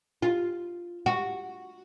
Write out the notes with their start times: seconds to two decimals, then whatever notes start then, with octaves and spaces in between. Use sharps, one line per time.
0.22 F4
1.06 F#4